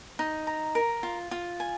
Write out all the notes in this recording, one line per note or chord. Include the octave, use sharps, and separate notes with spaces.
D#4
A#5
A#4
F4
F4
G#5